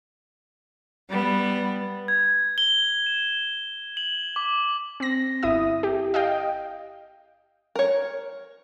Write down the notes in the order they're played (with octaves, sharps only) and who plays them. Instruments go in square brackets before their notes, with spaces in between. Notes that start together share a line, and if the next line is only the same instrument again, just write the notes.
[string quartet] G3 B3
[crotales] G#6
G7
E7
F#7
D6
[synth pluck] C4 A#6
G1 E4 E5 D#6
G4
D#5 F5 G5
[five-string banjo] A#4 C#5